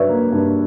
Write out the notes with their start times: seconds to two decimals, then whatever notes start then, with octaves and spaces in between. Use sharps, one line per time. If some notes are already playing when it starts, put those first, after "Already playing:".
Already playing: G2 F#3 B4 C#5 D5 E5
0.09 A#3
0.32 G2